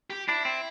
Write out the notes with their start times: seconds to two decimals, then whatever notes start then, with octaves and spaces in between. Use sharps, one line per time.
0.10 G4
0.28 D4 E4
0.45 C4